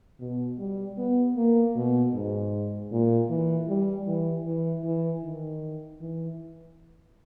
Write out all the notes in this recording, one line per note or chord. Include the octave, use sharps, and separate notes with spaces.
B2
G3
B3
A#3
B2
G#2
A#2
E3
G3
E3
E3
E3
D#3
E3